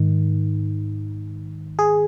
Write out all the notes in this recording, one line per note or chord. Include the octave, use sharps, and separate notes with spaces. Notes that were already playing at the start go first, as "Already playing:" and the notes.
Already playing: G#2 D#3
G#4